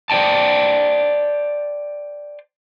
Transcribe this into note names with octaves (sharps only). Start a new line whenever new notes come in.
C5 D5 G5 A5